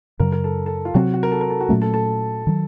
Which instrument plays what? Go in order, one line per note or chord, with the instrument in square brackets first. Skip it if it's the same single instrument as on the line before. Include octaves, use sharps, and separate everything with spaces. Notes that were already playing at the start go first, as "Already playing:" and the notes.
[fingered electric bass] F#2 C#3 F#3 [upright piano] A#4
[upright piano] A#4
A4
A4
F4
[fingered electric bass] C3 F#3 C4 [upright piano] F#4
[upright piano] F#4
A#4
A4
A#4
A4
F#4
[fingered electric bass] A#2 F#3 A3 C#4
[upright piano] A4
A4
[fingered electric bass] D#3 F#3